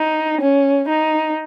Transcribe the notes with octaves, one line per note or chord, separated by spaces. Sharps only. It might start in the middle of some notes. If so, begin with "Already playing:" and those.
Already playing: D#4
C#4
D#4